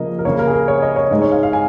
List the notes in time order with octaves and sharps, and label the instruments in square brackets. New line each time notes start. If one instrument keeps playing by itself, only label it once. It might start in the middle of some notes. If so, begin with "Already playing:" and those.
Already playing: [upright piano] C#3 F3 A#3 D#5
A#4
C#3 A#3 C#5
A#4
G#4
A#4
C#5
D#5
C#5
G#2 G#3
C#5
F5
F5
G#5